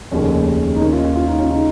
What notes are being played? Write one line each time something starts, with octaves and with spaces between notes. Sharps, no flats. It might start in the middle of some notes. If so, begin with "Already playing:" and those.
F1 D#2 C#3 C#4
D#4
D#2 D#3 C#4
F4
C#4
F4
D#4
C#4
C#3 D#4